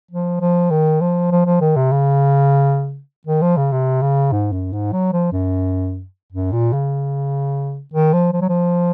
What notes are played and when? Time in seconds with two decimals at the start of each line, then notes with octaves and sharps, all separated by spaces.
0.11 F3
0.41 F3
0.71 D#3
1.01 F3
1.32 F3
1.46 F3
1.61 D#3
1.76 C3
1.92 C#3
3.27 D#3
3.42 F3
3.57 C#3
3.72 C3
4.02 C#3
4.32 G#2
4.52 F#2
4.73 G#2
4.93 F#3
5.13 F3
5.32 F#2
6.33 F#2
6.53 A#2
6.73 C#3
7.93 D#3
8.13 F3
8.33 F3
8.41 F#3
8.49 F3